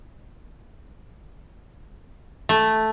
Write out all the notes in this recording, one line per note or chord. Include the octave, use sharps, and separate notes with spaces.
A3